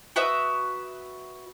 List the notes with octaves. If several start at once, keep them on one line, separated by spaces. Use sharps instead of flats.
F#4 B4 E5 D#6